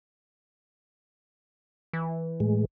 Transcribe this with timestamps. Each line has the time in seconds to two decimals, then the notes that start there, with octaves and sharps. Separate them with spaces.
1.93 E3
2.40 A2 G#3